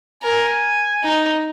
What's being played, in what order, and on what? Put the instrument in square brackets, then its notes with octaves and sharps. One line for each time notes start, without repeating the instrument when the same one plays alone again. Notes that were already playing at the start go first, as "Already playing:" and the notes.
[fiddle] A#4 [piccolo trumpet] G#5
[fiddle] D#4